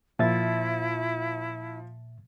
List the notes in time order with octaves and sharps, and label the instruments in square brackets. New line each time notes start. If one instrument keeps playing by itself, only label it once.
[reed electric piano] A#2 E5 A6 [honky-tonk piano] F3 [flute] E4